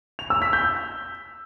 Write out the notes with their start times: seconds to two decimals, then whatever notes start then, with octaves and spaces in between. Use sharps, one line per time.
0.19 F7
0.30 E6
0.42 B6
0.53 G6